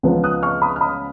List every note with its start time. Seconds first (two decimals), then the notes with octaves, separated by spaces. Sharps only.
0.03 C#2 C#3 F3 B3
0.24 D#6 F#6
0.43 C#6 F6
0.62 B5 D#6
0.76 F6
0.81 B5 D#6